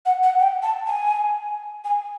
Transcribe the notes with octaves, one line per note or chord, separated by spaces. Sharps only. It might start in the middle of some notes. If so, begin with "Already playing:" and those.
F#5
F#5
G5
A5
G#5
G#5